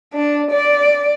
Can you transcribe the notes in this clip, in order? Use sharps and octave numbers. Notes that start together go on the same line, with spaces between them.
D4
D5